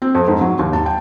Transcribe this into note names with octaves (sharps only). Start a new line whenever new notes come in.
C4
F2
G#2
F#3
D#2
A5
G5